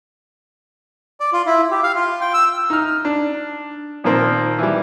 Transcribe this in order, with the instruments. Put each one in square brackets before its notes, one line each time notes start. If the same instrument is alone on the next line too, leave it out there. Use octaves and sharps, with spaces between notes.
[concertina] D5
F4
E4
G4
F5
F4
G5
E6
[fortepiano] D#4 F6
D4
A#2 D#3 F3 A#3 C4
E3 G3